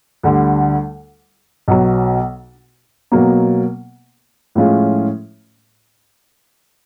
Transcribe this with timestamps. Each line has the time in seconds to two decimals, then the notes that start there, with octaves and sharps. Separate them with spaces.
0.23 D2 D3 G3
1.68 B1 B2 F#3
3.12 B2 F#3 A#3
4.55 A2 F3 G#3 C#4 F4